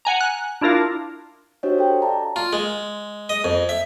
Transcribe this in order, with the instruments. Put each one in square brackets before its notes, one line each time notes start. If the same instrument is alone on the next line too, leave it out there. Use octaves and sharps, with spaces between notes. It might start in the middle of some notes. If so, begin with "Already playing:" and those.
[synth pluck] F#5 G#5 A#5
F#6
D4 E4 F4 A#4 F5
[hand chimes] D4 F#4 G4 C5 C#5 D#5
A4 G5
D5 F5 A5 A#5
[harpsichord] F4
G#3
D#5
F2
E5